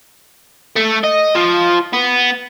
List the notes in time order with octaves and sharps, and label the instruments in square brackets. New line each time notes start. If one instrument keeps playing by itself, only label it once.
[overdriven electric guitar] A3
D#5
F3
B3